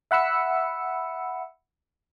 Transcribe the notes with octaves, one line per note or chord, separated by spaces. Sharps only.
E5 F#5 B5 E6 C#7